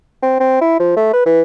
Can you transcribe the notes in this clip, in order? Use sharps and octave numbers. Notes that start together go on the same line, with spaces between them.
C4
C4
E4
F3
A3
B4
E3